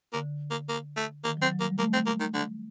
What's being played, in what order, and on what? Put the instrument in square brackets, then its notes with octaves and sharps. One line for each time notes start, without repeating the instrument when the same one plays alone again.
[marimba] D3 [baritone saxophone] A#3
[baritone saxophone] A#3
A#3
A3
[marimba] D#3 [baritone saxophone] A#3
[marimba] F#3
[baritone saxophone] C4
[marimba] F#3
[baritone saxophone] A#3
[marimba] G3
[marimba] A3 [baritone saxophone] A#3
[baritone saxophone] C4
A#3
D#3
D3